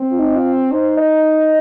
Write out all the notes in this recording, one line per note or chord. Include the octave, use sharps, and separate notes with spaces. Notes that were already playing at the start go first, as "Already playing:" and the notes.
Already playing: C4
F4
D#4
F4
D#4 C5
D#5